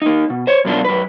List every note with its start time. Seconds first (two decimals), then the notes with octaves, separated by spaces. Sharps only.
0.02 A#3 D#4
0.30 B2
0.47 C5 C#5
0.65 F#2 B2 A#3 D4 F4
0.85 F#2 B4